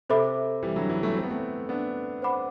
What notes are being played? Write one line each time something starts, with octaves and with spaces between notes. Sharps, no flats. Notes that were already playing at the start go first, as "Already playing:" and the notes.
C3 A4 C5 E5 B5 D6
E3 G3
D3 F#3
E3 G3
F#3 A3
C4
B3
A3 C4
B3 D4
C5 F#5 B5 D6